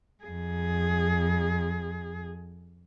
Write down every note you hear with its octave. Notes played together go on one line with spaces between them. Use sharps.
F2 G#4